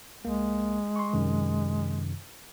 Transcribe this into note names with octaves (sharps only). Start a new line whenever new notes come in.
C2 G#3 A#3
C6 C#6
F#2 C3 D#3